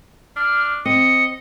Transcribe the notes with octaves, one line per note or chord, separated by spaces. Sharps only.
D4 F6
C4 D#5 C#7